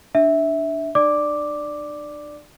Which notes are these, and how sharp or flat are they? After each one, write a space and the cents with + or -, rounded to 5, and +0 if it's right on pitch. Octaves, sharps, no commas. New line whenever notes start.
D4 +0 E5 -10
D4 +45 D5 +0 D6 +0